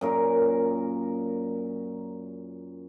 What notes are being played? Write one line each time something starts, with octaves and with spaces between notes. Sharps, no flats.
F#2 A#2 A#4